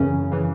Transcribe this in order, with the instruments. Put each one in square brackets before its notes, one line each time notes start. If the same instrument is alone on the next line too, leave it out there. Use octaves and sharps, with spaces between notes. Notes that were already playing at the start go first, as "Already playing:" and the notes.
Already playing: [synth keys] F#2 C#3 E3 C#4
C#3 E3